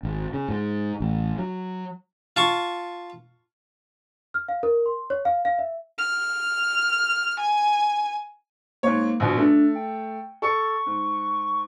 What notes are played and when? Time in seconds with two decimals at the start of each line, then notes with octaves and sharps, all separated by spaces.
0.03 G#1
0.34 C#3
0.48 G#2
1.00 A1
1.38 F#3
2.36 F4 A5 C#6
4.34 F6
4.48 F5
4.63 A#4
4.86 C6
5.10 C#5
5.25 F5
5.45 F5
5.59 E5
5.98 F6
7.39 G#5
8.83 G#2 A#3 C#5
9.20 A#1 G2 B2
9.38 A3 D4
9.75 G5
10.42 A4 C#6 C#7
10.86 G#2